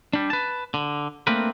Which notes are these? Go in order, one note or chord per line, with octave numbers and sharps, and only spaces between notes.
G3 D4
B4 A5
D3
A3 A#3 C4 D4 A#4 B4